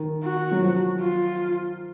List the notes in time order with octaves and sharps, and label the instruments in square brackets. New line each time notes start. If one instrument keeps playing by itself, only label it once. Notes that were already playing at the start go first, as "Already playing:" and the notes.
Already playing: [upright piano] D#3
[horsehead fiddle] F#4
[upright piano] F#3
F3
[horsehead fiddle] F4